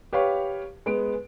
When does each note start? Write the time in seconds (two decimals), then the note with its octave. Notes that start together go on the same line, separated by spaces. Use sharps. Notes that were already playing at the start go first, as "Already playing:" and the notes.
0.13 G4 B4 C#5 F5 C#6
0.86 G#3 B3 D7